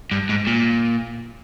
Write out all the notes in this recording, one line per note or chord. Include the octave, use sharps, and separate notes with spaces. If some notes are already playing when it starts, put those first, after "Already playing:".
G2
G#2
A#2